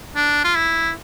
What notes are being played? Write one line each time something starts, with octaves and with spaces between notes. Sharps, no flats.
D4
F4
E4